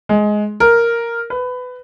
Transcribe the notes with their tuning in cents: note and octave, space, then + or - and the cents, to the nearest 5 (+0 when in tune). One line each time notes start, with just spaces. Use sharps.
G#3 +15
A#4 +0
B4 +20